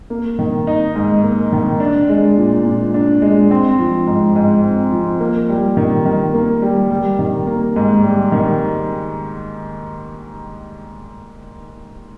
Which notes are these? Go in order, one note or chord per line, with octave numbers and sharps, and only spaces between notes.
A#3
D#3
D#4
G#2
A#3
D#3
D4
G#3
A#2
A#2
D4
G#3
C4
F3
G#2
G#2
C4
F3
A#3
G3
D#3
D#3
A#3
G3
G3
D#3
A#3
G#2
G3
D#3